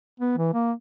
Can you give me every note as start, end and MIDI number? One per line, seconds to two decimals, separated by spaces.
0.20 0.33 59
0.37 0.51 52
0.54 0.73 58